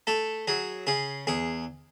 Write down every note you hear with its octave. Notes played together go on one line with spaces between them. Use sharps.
A3 A4
F#3 G#4
C#3 G#4
E2 G#4